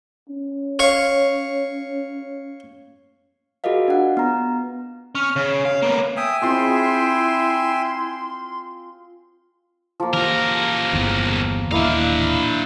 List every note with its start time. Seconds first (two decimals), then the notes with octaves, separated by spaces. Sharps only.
0.30 C#4
0.79 C#5 F5 C#6
3.64 F4 F#4 G#4 A#4 D#5 F5
3.88 D4 F#5
4.17 B3 A#5
5.15 C#4 F6
5.36 C#3 C#5
5.65 F5
5.82 A#3 B3
6.17 E5 G5 G#5 D#6
6.42 C4 E4 F4 G#4 C6
10.00 F3 A#3
10.13 C#2 E3 G4 A#4
10.93 G1 E2
11.71 D#1 A#3 D4 E4 D#5 F5